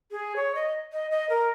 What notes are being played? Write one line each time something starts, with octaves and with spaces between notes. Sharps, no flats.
G#4
C#5
D#5
D#5
D#5
A#4